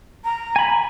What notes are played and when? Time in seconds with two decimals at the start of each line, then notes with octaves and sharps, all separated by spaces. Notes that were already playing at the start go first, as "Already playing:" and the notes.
0.24 A#5
0.56 G#5 B5